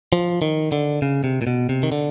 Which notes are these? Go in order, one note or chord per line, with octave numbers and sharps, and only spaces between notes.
F3
D#3
D3
C#3
C3
A#2
B2
C3
D#3
D3